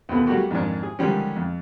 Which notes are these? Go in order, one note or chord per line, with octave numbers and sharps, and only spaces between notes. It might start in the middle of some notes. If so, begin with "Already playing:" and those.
D#2 B2 B3 A4
F#3 G3 A3 A#3 F#4 G4
F2 G#2 D#3 C#4 D4
G#4
D3 D#3 F3 G3 G#3 C#4
F2